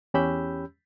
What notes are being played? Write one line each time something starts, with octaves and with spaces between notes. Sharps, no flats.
E2 C#4 G4 B5 E6 G6